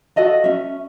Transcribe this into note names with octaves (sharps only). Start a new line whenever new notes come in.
F#4 A4 D#5 F5
C#4 E5